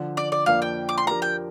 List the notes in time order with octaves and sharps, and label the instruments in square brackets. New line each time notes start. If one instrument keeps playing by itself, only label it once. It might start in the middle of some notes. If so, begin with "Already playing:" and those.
Already playing: [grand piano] D3 F3 D4
[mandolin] D5
D5
[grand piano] F2 F3 A#3 D4 [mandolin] F5
[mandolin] G5
D6
C6
[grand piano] F3 D4 G4 A#4 [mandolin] A#5
[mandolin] G5